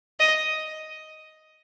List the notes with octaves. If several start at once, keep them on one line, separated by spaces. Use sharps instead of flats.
D#5